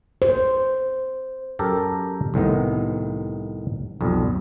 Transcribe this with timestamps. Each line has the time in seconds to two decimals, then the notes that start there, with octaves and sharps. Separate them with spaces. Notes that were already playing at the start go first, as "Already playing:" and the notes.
0.22 C5
1.59 F#2 G4 A4 A#4 A#5
2.34 C2 A2 D#3 B3
4.01 B1 F2 G3